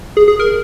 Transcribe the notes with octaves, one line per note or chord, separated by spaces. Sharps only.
G#4
G#4
A#4